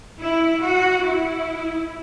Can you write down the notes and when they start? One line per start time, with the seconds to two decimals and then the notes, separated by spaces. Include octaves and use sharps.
0.20 E4
0.63 F#4
1.06 E4